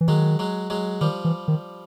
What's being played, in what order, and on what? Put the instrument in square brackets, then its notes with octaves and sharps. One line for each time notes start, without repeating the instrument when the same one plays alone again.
[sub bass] E3
[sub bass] D#3 [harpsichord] F#3 G#3
[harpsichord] F#3 G#3
F#3 G#3
[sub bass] D#3 [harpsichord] F3 G3
[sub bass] E3
D#3